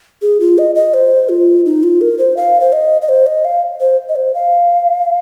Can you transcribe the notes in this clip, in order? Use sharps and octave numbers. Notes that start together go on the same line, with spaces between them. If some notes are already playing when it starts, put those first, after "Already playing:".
G#4
F4
D#5
D#5
C5
F4
D#4
F4
A#4
C5
F5
C5
D#5
D#5
C5
D#5
F5
C5
D#5
C5
F5